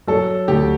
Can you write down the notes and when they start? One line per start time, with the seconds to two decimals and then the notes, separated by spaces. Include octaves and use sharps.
0.07 F#3 A4
0.48 D2 G4